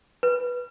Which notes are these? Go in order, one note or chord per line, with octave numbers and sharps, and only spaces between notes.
B4